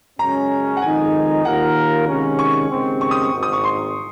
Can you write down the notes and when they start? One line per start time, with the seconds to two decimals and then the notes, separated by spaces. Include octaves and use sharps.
0.19 F#2 C#3 G#3 C#4 A#5
0.77 F#5
0.82 F2 D#3 G#3 D#4 G#5
1.44 D#2 D#3 A#3 F4 A#4 F#5
2.07 C3 D#3 G#3 C#4
2.39 C#6
2.70 D#2 C#3 G#3 C4
3.01 C#6
3.11 D#6
3.22 C#6
3.33 G#1 G#2 D#3
3.43 D#6
3.53 C#6
3.64 C6